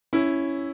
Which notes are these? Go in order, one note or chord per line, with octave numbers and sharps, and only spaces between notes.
C#4 E4